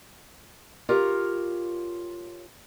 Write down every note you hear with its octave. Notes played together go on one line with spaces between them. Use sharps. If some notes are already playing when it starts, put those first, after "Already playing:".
F4 G4 A#4 C#5